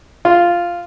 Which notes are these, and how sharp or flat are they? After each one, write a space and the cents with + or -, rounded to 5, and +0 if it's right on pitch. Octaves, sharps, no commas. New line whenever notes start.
F4 -5